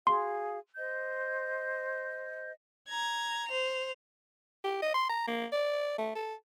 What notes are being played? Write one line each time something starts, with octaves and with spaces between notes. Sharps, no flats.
F#4 G#4 F5 C6
C5 D#5 G6
A#5 G#6
C5 F7
G4
D#5
C6
A#5
A#3
D5
A3
A4